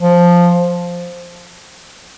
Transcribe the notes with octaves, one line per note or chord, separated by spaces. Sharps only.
F3